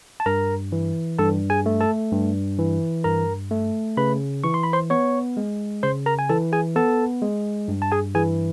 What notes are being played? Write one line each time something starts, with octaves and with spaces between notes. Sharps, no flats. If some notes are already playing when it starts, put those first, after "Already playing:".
A5
G2 A#4 A#5
E3
G2 A4 A5
G#4 G#5
A3
A4 A5
G2
E3
G2 A#4 A#5
A3
C#3 B4 B5
E3 C#6
C6
B5
C5 C6
B3 C#5 C#6
G#3
C#3 C5 C6
A#4 A#5
G#5
E3 A4 A5
G#4 G#5
B3 A4 A5
G#3
G2
A5
G#4 G#5
E3 G#4 G#5